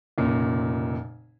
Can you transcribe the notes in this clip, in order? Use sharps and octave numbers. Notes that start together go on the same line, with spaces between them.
F1 A#2 C#3